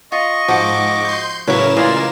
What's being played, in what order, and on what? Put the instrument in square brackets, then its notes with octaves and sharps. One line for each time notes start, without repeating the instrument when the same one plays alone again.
[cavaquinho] F4 [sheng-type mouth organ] D#5 C#6
[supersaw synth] G#2 D6 [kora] F3 [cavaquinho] F#4
[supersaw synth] C6 G6
[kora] A2 F#3 [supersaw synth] C#3 A#4 E7 [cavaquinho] E4 B4 [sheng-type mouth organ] C#5
[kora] E3 A#3 F4 [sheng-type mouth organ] D5 F5 G#5 [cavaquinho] D#5